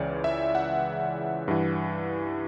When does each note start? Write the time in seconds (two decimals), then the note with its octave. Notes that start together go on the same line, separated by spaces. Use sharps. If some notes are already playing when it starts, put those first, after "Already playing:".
Already playing: C#2 C#3 E3 C#5 D5
0.24 E5
0.55 F#5
1.48 G2 E3